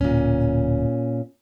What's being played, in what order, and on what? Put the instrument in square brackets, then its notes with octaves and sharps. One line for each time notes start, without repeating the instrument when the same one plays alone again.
[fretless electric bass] D1 [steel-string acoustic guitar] A#2 C#4